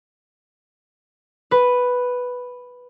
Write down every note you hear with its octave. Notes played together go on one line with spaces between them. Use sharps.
B4